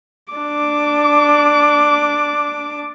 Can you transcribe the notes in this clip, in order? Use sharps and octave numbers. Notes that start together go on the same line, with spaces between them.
D4 D6